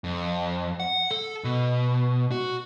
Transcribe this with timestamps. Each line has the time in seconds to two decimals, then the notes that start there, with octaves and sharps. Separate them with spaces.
0.04 F2
0.80 F#5
1.11 A4
1.44 B2
2.31 F#4